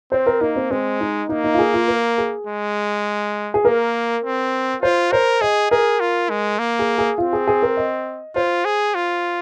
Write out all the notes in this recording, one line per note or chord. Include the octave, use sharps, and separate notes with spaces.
C4 C5
A#4
A#3 D#4
C4
G#3 C4
D#4
A#3 D#4
D#4
F4
G#4
F4
A#4
G#4
G#3
G#4
A#3 A#4
C4
F4 C5
A#4 C5
G#4 D#5
G#4 A#4
F4
G#3
A#3
G#4
G#4
C4 F4
G#4
G#4
A#4
D#5
F4 C5
G#4
F4